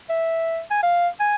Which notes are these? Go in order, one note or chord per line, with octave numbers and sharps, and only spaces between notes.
E5
G#5
F5
G#5